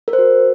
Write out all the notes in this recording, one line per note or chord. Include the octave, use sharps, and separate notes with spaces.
A#4
C5
F#4